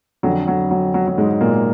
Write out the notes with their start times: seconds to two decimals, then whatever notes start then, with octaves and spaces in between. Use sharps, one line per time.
0.23 F2 D3 F#3
0.48 F#3
0.71 F#3
0.94 F#3
1.07 F#3
1.18 G#2 G#3
1.41 A#2 A#3